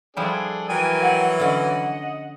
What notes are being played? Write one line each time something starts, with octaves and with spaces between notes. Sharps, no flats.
F3 G3 D4 E4 G#4 A4
E3 F#3 A#4 G5 G#5
F#5
D3 C#4 D#5 F#5